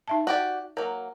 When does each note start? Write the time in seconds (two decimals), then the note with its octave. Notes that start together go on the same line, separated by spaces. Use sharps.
0.08 D#4 E5 A5
0.27 F#4 G4 D5
0.77 F#3 A#3 A#4